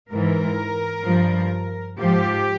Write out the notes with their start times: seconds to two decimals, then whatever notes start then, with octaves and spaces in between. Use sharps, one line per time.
0.11 G#2 E3 A#4
1.05 G2 F3
1.97 G#2 F3 G4